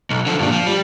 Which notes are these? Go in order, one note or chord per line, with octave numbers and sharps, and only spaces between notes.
B1
D3 F3
G2 A#2
F3
G3